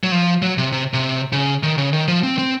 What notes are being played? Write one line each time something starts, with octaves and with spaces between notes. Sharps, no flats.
F#3
F3
F#3
C3
C3
C3
C#3
D#3
C#3
D#3
F3
C4
C4